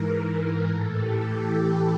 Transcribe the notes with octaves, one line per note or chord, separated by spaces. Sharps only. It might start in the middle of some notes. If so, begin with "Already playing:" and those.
Already playing: G#2 E3 A#4
A2 E3 A4
G4